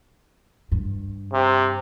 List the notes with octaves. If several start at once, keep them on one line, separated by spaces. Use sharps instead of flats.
G2
C3